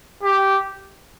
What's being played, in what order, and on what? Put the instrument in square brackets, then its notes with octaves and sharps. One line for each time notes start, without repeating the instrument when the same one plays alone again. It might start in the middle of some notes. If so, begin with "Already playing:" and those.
[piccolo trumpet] G4